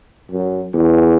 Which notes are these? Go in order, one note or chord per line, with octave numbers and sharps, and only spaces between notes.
F#2
E2